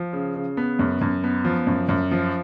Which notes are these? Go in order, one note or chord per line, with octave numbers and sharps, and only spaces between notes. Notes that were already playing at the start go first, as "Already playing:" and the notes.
Already playing: F3
C#3
C#3
B3
F#2
F#2
B3
F3
F#2
F#2
F3